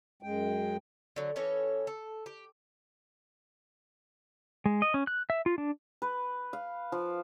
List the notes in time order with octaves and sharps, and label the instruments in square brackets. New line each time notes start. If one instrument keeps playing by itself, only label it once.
[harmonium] F#2 G#3 G5
[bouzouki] D3 F#3
E3 C#4 A4 C#5
A4
G4
[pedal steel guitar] G#3
D#5
C#4
F#6
E5
F4
D4
[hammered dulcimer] B4
F5
F3